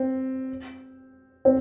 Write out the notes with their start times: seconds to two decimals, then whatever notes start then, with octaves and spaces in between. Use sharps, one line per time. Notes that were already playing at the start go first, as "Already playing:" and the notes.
Already playing: C4
1.45 C4